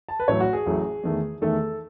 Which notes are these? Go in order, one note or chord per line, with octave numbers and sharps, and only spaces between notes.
A5
B4
A1 A2 F#3 A3 C#5
F#4
G#4
A1 A2 F#3 A3
E2 D#3 A3
E2 D#3 A3 A4